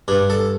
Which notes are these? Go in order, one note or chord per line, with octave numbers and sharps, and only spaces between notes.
G2 D4
A4